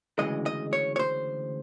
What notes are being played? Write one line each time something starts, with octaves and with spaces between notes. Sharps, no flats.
D2 C#3 E3 G#3 D#5
D#5
C#5
C#5
C5